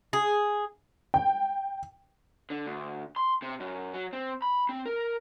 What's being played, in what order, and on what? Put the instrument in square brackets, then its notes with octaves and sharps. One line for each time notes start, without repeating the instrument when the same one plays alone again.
[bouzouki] G#4
[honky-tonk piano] G5
[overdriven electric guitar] D3
D2
C6
C3
F#2
F#3
C4
B5
C4
A#4